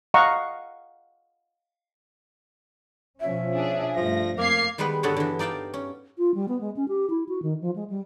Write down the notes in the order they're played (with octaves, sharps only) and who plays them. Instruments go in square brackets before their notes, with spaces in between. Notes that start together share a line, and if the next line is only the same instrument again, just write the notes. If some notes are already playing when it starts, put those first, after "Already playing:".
[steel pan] D#5 F5 F#5 A#5 C#6
[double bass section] B2 F3 C#4 [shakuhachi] E5
[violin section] D4 G#4
[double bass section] G2 A3 [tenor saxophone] F3 [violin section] A#6
[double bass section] F2 [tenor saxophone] A#3 [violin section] F5 G#6 C7 [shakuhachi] D6
[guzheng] D#3 G3 G#3 B3 B4
G2 D3 B3 A4 B4 C#5
D3 E3
D#4 D5 F5 G5 A5
C#4
[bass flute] F4
G3
B3
G#3
C#4
G4
E4
F#4
D#3
F3
G#3
G3